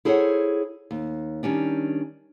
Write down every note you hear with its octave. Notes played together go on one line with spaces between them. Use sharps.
E4 G#4 A4 C5 C#5 F#5
D#2
D#3 G3 C#4 D4